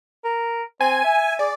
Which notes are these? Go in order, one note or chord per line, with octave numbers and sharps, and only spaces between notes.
A#4
C4 G#5
E5
G#4 D5